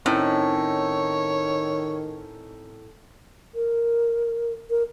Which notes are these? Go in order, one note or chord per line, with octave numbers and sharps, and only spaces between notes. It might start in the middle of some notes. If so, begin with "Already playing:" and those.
A2 D#3 C4 C#4 D#4 C#5
A#4
A#4